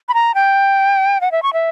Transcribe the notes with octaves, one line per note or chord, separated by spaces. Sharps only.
B5
A#5
G5
F#5
E5
C#6
E5